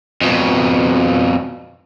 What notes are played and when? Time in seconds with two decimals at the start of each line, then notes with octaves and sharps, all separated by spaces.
0.21 F2 B2